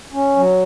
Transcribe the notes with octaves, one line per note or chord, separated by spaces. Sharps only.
C#4
F#3